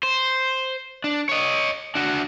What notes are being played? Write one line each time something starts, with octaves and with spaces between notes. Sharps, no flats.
C5
D4
C#5 D#5
D4 F#4